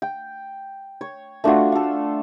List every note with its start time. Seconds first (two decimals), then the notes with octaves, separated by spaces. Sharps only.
0.02 G5
1.01 C#5
1.44 A3 D4 F4 F#4
1.72 A4 F5